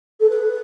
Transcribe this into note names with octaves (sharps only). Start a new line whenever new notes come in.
A4
B4